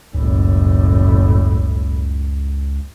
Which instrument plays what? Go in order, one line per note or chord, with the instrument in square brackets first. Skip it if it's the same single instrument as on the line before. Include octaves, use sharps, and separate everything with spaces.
[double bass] F#1 A2 [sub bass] C#2